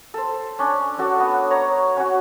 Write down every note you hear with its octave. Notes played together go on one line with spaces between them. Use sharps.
A4 C5
C#4 D4
C#4 D4 F#4 A4
B3
C#5 A#5 C#6
C#4 F#4